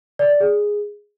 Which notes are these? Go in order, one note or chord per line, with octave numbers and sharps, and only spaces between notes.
D5
D5
G#4